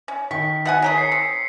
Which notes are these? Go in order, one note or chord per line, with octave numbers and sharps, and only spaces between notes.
C#4
D#3 C#6 B6
B2 F#5 G#5
D#3 G4 G#4 C#5 A#5 B6
C7 C#7
C4